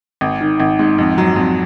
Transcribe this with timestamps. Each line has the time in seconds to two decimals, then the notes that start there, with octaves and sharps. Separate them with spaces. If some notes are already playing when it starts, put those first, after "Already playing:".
0.21 G#1
0.41 D#3
0.60 G#1
0.79 G#2
0.98 F2
1.18 F#3
1.36 F2